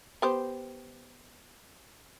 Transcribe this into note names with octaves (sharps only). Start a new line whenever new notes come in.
B3 G4 C5